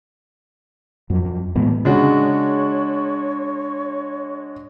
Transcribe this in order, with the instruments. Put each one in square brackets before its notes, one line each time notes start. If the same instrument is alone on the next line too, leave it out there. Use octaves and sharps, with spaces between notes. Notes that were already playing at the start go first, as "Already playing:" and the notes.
[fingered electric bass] F2 F#3
A2 E3 G#3 B3
[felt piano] C#3 [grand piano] G#3 D4 F#4 [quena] C#5